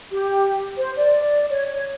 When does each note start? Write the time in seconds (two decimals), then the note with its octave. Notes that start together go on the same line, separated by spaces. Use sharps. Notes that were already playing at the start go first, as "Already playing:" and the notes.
0.11 G4
0.77 C5
0.96 D5
1.50 C#5